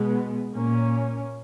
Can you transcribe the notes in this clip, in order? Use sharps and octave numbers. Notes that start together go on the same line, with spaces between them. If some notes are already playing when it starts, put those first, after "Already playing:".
Already playing: B2 G#3 B3
A#2 A#3 C#4